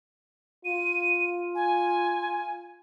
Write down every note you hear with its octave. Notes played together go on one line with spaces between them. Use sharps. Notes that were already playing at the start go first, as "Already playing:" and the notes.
F4 D#7
G#5